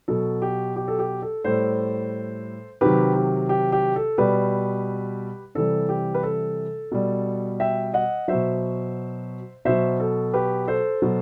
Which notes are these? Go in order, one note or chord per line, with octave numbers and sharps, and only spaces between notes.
B2 F#3 A4
G4
G4
A4
G4
A4
A2 G3 A4 C5
C3 D#3 F#3 G4 B4
G4
G4
G4
A4
B2 G3 G4 B4
C3 E3 G3 A4
G4
B4
A4
B2 G3
E5 G5
D#5 F#5
B2 F#3 C5 E5
B2 F#3 C5 E5
A4
G4 B4
A4 C5
B2 F#3